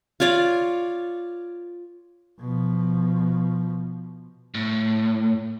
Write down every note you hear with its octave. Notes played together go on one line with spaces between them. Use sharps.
F4 C#5 D5 F5
B2 F3
A2